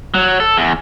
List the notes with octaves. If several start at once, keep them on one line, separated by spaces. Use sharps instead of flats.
F#3
A4
E2